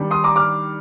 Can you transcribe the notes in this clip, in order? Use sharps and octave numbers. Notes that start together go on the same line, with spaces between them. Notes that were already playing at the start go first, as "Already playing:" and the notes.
Already playing: D#3 G3 D4
C6 D#6
A#5 D6
D6 F6